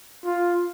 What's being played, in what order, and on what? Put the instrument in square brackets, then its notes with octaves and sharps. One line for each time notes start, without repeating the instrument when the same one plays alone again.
[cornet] F4